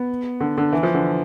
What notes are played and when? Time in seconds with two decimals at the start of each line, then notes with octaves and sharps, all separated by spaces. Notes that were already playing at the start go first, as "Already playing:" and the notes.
Already playing: B3
0.41 D3
0.58 D3
0.72 E3
0.83 F3
0.94 D3